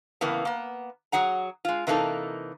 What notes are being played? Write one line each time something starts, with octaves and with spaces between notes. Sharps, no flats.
A2 C#3 E3 A#3 B3
A#3 B3
F#3 G#4 F#5 A#5
G#3 F4
C3 E3 A#3 D#4 A4